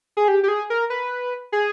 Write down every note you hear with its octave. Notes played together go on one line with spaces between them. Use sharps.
G#4
G4
G4
G#4
A#4
B4
G#4